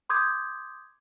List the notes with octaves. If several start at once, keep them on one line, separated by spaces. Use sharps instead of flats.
C6 D6 D#6 G6 G#6